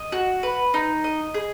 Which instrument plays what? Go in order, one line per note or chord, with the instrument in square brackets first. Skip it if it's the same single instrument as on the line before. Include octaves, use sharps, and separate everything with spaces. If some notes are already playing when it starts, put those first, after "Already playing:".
Already playing: [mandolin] D#5
F#4
B4
D#4
D#5
G#4